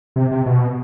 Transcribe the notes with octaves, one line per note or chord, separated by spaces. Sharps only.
C3
C3
B2